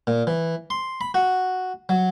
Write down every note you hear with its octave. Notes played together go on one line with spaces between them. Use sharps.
A#2
E3
C6
B5
F#4
F#3